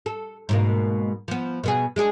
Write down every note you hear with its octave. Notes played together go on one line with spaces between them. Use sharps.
A4
G#2 B2 A#3
F3 B3
B2 B3 G#4
G#3 D4 G#4